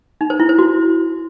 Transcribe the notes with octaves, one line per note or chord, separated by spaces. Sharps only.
D#4
C5
E4
C5
F#4